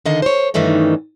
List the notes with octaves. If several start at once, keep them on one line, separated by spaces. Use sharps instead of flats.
D3 D#3 D#5 F5
C5 C#5
G2 D#3 E3 A3 C#4 D#4